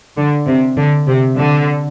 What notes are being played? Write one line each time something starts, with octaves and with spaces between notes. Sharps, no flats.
D3
C3
D3
C3
D3